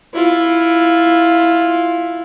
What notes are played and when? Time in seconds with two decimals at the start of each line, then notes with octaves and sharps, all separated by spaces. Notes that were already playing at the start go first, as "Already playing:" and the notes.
0.14 E4 F4